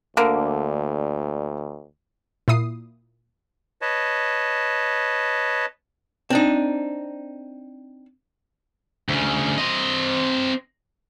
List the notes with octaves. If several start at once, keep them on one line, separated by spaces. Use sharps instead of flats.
D2 D3 A#3
A#2 E4 D#6 C7
B4 C#5 D#5 A5
C4 D4 D#4
D2 C#3
C4 D#5